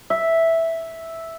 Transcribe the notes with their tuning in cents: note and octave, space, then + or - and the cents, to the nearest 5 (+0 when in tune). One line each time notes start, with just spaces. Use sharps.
E5 -5